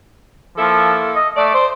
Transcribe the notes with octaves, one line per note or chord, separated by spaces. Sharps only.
F3 A#3 E4 A4
D#5
A3 D5
C5